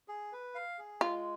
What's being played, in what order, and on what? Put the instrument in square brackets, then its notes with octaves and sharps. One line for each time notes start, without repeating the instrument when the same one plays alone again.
[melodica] G#4
B4
F5
G#4
[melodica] G#3 [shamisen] F4